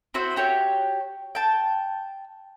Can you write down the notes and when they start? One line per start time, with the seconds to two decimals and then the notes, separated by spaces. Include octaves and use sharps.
0.14 C4 E4 F#4 C5
0.36 F#4 G4 C#5 G5
1.35 G5 A5